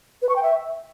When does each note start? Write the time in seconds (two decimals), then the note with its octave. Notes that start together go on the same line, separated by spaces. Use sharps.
0.22 B4
0.29 C#6
0.36 G5
0.43 E5